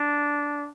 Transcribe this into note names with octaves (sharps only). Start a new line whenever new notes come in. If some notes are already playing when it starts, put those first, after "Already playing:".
Already playing: D4